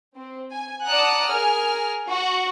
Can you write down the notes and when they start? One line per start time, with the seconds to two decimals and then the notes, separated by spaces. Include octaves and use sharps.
0.16 C4
0.52 G#5
0.85 D5 F#5 A5 A#5 D#6 F#6
1.27 G#4 A#4 G#5 F6
2.09 F#4